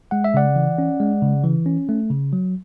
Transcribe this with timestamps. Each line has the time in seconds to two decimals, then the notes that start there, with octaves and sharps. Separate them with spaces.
0.11 G#3 F#5
0.24 E5
0.34 C#3 D5 F#5
0.56 E3
0.78 C#4
1.00 G#3
1.22 C#3
1.44 E3
1.66 C#4
1.89 A3
2.10 C#3
2.33 F#3